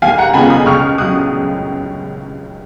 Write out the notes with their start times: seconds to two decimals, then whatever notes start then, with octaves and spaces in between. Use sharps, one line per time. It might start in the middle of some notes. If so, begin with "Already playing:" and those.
0.02 D#2 F5 G#5
0.18 F#5 A#5
0.33 C#3 G#3 B3 F4 G#5 B5
0.50 B5 D#6
0.66 C#2 C#6 F6
0.98 C#3 F#3 D#6 F#6